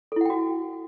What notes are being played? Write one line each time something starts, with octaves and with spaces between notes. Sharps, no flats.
E4 F#4 A4 F#5 G5